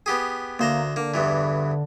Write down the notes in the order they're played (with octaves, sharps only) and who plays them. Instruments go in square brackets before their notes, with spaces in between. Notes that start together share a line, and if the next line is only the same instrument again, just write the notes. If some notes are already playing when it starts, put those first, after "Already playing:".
[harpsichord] B3 G4 G#4
[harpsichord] D2 C5 A#5 [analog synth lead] A#3
[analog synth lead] D3 [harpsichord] A#3
[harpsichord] E2 G2 E3